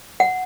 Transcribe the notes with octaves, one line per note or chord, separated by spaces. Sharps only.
F#5